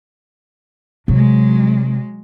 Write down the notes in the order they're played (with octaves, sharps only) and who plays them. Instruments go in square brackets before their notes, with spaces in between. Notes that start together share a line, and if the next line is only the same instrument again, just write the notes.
[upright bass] C3 [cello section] F#3 G#3